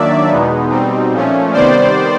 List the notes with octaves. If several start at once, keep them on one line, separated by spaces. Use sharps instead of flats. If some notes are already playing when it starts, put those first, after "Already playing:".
Already playing: D#3 F#3 A#3 D4 D5 E5
E2 B2 G#3 B3 D#4
B2 G3 C4 D#4
A#2 F3 A3 C#4
C3 D#3 G3 B3 C5 D5